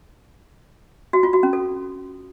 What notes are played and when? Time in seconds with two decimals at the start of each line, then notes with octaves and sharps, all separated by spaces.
1.13 F#4
1.23 F4
1.33 F#4
1.43 C#4
1.53 A4